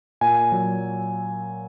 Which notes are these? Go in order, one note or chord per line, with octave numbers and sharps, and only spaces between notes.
A#2 G#5
F#3